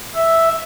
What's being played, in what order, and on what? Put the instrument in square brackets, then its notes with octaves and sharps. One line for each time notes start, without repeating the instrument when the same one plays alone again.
[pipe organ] E5